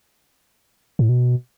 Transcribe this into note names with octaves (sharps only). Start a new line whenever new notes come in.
A2
B2